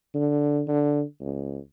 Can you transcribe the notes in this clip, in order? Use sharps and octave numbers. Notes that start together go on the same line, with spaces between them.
D3
D3
C#2